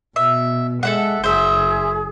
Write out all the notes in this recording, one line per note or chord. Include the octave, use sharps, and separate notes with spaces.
B2 E5
G#3 A4 E5 F#5
F#1 G#4 C5 E5